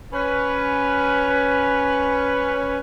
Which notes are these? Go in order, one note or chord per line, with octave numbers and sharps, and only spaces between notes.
C#4 B4